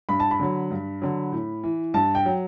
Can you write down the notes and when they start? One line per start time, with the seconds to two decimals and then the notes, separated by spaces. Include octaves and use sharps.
0.09 G2 B5
0.20 A5
0.31 B5
0.40 D3 F#3
0.71 G2
1.02 D3 F#3
1.32 A2
1.63 E3
1.94 G2 A5
2.15 G5
2.25 F#3